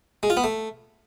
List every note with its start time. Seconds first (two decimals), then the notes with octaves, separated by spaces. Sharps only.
0.23 G#3
0.30 F4
0.37 B3
0.44 A3